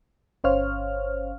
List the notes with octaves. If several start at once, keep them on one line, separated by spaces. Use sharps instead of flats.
G1 C#4 C5 C#5 F5 F6